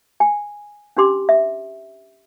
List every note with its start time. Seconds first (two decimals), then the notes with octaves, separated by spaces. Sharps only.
0.20 G#5
0.97 C#4 D4 G4 C6 D6
1.29 E5